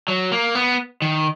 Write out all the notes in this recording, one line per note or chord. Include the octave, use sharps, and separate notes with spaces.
F#3
A#3
B3
D#3